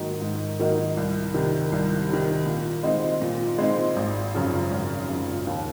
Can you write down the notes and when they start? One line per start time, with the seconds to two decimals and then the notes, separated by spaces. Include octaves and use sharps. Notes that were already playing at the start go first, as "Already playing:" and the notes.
Already playing: G#2 D#3 F#3 A#3 D#4
0.21 G#2
0.60 D#3 F#3 A#3 D#4
0.97 C2
1.34 C3 D#3
1.72 C2
2.10 C3 D#3
2.46 A#2
2.83 G#3 C4 D#4
3.22 A#2
3.59 G#3 C4 D#4
3.96 G#1
4.34 F#2 C#3 F3
4.71 G#1
5.09 F#2 C#3 F3
5.47 D#2